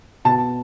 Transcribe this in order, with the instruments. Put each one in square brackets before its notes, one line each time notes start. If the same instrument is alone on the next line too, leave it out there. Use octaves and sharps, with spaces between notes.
[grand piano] B2 A5